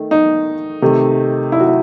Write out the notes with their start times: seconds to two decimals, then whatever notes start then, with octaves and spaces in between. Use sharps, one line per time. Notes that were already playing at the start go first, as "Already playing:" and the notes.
Already playing: D#3 A3
0.11 D#4
0.82 C3 D#3 A3
1.52 E4
1.59 F#4
1.67 E4